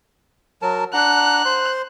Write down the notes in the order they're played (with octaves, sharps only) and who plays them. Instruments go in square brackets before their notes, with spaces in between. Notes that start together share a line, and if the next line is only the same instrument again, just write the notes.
[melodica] F#3 A#4 A5
[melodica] D4 F#5 A#5 [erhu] F#6
[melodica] C5 C6